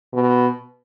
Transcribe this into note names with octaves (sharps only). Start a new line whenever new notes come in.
B2